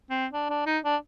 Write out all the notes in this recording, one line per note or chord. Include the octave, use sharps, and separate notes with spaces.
C4
D4
D4
D#4
D4